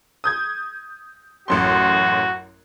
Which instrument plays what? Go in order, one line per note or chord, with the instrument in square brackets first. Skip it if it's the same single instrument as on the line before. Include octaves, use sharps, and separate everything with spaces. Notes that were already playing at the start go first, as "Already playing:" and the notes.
[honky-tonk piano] D#6 G6 G#6
[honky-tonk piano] A1 F#2 C6 [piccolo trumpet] F#4